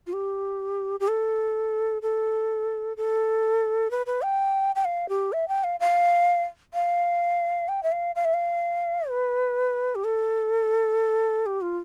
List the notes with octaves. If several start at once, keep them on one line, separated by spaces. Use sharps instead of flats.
F4
G4
G4
A4
A4
A4
B4
B4
G5
G5
F5
G4
E5
G5
F5
F5
F5
G5
E5
F5
F5
E5
F5
B4
G4
A4
G4
F4